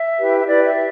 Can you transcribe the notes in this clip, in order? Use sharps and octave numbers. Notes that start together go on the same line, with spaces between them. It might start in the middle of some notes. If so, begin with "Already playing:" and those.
Already playing: E5
E4 G4 B4
E5
E4 G4 B4 D5
E5